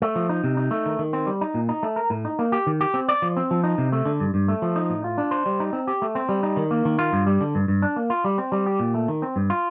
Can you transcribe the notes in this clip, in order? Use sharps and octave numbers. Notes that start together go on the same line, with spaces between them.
A3
F3
D#4
C3
D#4
A3
D#3
D#3
C4
G3
D#4
A#2
D#4
A3
A#4
A2
D#4
A#3
G4
D#3
G4
C4
D5
F3
C4
F3
D#4
C3
A3
D3
G2
G2
A3
F3
D#4
A2
F4
D4
C5
G3
D#4
C4
G4
A3
C4
G3
D#4
D#3
A#3
D#3
F4
G2
G3
D3
G2
G2
D4
A#3
F4
G3
C4
G3
G4
A#2
A3
D#3
C4
G2
F4